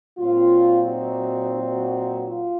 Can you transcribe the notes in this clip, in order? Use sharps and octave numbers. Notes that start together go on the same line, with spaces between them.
A#2 F#3 C4 F4
D#4 F#4
D#4 F#4
F4